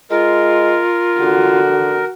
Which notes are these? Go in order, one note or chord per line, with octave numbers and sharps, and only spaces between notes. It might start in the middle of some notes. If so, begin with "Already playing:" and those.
G#3 F4 A#4
D3 F#4